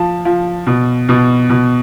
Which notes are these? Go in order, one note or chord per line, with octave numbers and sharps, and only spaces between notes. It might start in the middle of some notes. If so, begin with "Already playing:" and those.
Already playing: F3 A5
F3
B2
B2
B2